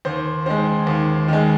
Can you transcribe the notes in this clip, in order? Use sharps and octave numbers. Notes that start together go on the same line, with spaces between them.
D#2 C5
D#3 G#3 C5
D#2
D#3 G#3